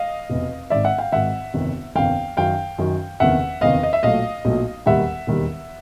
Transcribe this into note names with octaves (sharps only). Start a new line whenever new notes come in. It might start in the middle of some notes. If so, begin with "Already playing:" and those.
Already playing: D#5 F5
F1 E2 B2
G#1 G#2 D#3 D5 E5
E5 F#5
F5 G5
G#1 G#2 D#3 E5 F#5
G1 F2 C3 D#3
G1 F2 C3 D#3 F5 G5
F#2 D#3 F#3 F5 G5
F#2 D#3 F#3
F#1 E2 C3 D#3 E5 F#5
F#1 E2 C3 D#3 D#5 F5
D#5
E5
B1 A#2 F#3 A3 D#5 F5
B1 A#2 F#3 A3
E1 D#2 D#3 G3 E5 F#5
E1 D#2 D#3 G3